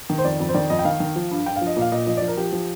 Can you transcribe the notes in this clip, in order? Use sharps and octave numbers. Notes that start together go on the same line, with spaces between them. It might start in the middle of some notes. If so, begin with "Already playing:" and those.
D#3
C5
F2 D5
F2
C5
D#3 D5
F2 D#5
G5
D#3 F5
D#3
F3
G2
G2 G5
F5
F3
D#5
A#2 F5
A#2 D#5
F3 D#5
F3 D5
A#4
F3 G4
F3